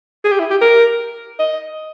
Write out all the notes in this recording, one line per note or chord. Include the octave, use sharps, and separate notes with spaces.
G#4
G4
E4
G4
A#4
D#5